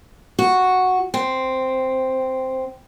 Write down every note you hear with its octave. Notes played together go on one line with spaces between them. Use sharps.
F#4
C4